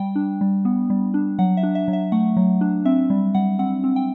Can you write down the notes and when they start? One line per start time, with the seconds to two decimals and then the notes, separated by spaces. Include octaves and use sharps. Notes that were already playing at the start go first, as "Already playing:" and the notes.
Already playing: G3 G5
0.16 D4
0.41 G3
0.65 B3
0.90 G3
1.14 D4
1.39 F#3 F#5
1.57 E5
1.63 D4
1.75 E5
1.88 F#3
1.93 E5
2.12 A3 F#5
2.37 F#3
2.61 D4
2.85 C4 E5
3.10 G3
3.34 G3 F#5
3.59 C4 F#5
3.84 C4
3.96 G5